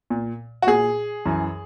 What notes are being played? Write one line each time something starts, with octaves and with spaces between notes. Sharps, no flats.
A#2
F#4
A#2 G#4
F#2 E3